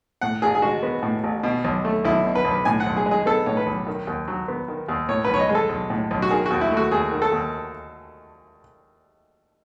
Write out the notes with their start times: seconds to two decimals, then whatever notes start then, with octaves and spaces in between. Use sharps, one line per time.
0.21 A2 F#5
0.42 A1 G#4
0.55 G#4
0.62 G#3 F#4
0.83 B3
1.03 A2
1.24 A1
1.43 B2
1.65 B1
1.85 A3
2.05 B1 E4
2.25 B2
2.35 B4
2.45 B1
2.51 B4
2.65 A2 G#5
2.80 F#5
2.86 B1
2.96 G#4
3.06 G#3
3.11 G#4
3.26 B3 A4
3.46 A2 C#5
3.57 B4
3.66 B1
3.87 D#3
4.07 D#2
4.28 F#3
4.48 B3
4.68 D#3
4.88 D#2
5.09 A2 C#5
5.25 B4
5.30 B1 C#5
5.39 D#5
5.49 G#3
5.55 A4
5.69 B1
5.90 A2
6.11 B1
6.22 F#4
6.31 D#3 G#4
6.46 D#2 F#4
6.61 E4
6.71 A3
6.77 F#4
6.91 D#2 G#4
7.12 D#3
7.22 A4
7.32 D#2